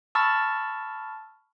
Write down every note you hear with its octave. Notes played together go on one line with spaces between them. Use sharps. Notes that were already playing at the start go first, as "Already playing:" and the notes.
A5 B5 C#6 E6 F6 A6